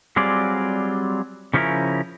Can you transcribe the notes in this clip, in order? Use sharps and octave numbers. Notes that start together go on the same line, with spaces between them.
F#3 G3 C4 F4 G#4 D5
C#3 F3 C#4 D4 E4 A#4